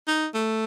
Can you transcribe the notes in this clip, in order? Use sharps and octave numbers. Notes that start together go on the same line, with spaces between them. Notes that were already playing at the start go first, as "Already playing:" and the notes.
D#4
A3